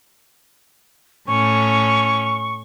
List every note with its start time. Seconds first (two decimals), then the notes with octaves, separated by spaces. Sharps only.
1.27 A2 C#4 C#6